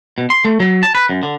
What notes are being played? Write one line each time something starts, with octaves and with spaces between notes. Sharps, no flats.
B2
C6
A3
F#3
A5
B4
F#2
D3